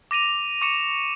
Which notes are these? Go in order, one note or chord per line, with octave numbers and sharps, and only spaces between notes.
D6 A#6 D#7 F7
C#6 D6 C#7 E7